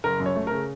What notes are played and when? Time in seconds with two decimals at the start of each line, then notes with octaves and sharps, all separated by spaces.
0.04 F#1 A#4
0.20 F#2
0.26 C#5
0.36 A3
0.47 C#3 A#4